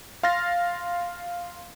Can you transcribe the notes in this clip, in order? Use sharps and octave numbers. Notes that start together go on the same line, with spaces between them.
F5 C6 F6 A6 A#6